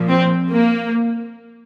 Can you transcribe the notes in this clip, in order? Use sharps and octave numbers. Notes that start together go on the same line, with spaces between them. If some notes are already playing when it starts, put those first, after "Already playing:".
Already playing: A#2 F3
C4
A#3